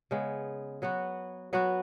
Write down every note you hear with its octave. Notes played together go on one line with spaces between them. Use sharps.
C#3 G#3 B3
F#3 B3 F#4
F#3 B3 F#4